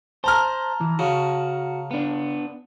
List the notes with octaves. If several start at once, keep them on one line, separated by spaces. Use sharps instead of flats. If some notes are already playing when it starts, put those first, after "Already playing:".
C5 A5 A#5 F6
E3
C#3 F#4
B3 D4